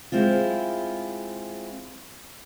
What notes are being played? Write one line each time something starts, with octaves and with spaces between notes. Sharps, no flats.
G#3 C4 E4 F4